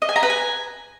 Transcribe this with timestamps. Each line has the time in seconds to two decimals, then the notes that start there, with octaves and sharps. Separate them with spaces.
0.02 D#5
0.09 G#5
0.16 A#5
0.23 B4
0.30 G#5